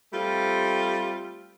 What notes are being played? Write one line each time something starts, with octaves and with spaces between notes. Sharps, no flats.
G3 A3 C4 F4